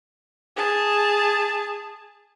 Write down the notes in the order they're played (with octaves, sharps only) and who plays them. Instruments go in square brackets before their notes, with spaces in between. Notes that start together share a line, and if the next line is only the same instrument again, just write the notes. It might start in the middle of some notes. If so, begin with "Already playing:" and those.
[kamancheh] G#4 A5